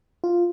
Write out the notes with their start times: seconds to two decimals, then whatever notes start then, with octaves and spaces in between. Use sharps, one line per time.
0.24 F4